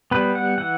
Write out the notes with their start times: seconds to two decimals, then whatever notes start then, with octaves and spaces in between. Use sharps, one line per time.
0.11 G3 B3 B4
0.35 F#5
0.58 E3 F#5